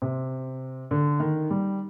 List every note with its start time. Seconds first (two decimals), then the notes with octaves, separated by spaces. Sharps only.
0.02 C3
0.91 D3
1.20 D#3
1.50 G3